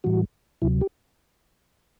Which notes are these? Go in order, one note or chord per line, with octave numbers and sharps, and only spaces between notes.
A2 E3 G3 F#4
D2 C3 F#3 E4
G4